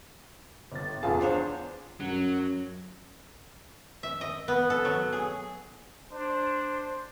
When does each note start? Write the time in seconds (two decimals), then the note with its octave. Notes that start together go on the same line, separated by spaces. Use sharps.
0.72 G1 A6
1.03 E2 F4 G#4 A5
1.21 D4 C5 C#5
2.00 F#2 F#3
4.03 E5
4.21 D#5
4.48 B3
4.70 A4
4.85 F#3
5.13 G#4
6.12 D4 C5